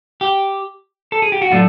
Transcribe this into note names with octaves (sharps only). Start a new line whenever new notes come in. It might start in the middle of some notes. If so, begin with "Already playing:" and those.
G4
A4
G#4
G4
F#4
A2 F#3 A3 D4 F4